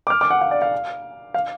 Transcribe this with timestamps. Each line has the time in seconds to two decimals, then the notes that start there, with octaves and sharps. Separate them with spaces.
0.07 D6
0.10 F6
0.21 D6
0.30 F#5
0.41 F5
0.51 D5
0.62 F5
1.34 F5